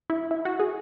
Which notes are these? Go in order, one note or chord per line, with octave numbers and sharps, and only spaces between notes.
E4
E4
F#4
G#4